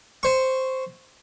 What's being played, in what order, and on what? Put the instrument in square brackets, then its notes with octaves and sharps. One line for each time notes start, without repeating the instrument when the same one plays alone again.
[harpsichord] C5 C#6